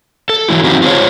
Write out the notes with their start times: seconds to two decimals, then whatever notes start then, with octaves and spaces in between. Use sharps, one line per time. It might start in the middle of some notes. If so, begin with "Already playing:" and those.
0.29 A4
0.49 E3 F#3 G3 E4
0.64 D#3 F3 C4 D#4 F#4 G4
0.82 F4 F#4 G#4 A#4 C5 C#5